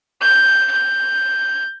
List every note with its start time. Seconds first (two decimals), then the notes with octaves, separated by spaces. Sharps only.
0.22 G6
0.72 G6